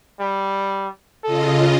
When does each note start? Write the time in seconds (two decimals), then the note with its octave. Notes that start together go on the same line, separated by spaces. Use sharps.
0.20 G3
1.24 C#3 F4 A4 D#5